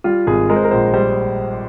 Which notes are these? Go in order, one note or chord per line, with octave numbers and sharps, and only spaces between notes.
G3 F4
G#1 G#4
G#3 A#4
C5
A#4
A#1 C5
G3 C5